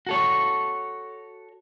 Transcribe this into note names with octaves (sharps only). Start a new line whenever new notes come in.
F#4 A4 C#5